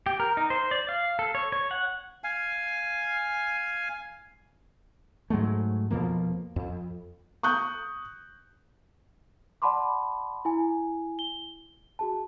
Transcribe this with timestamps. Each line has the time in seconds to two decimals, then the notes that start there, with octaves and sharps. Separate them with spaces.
0.06 G4
0.20 A#4
0.37 D#4
0.50 C5
0.71 D5
0.89 F5
1.19 A4
1.35 C#5
1.52 C#5
1.71 F#5
2.24 F5 G#5
5.30 G#2 F#3 G#3 A3
5.91 F2 B2 F3 A#3
6.56 F2
7.43 C#6 D#6 F#6 G6
9.62 D5 F#5 A5 B5 C6 D6
10.45 E4 G#5
11.19 G7
11.99 F#4 G#4 A5